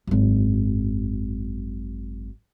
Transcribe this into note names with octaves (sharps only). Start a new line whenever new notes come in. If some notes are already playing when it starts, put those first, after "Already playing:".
G#1 F#2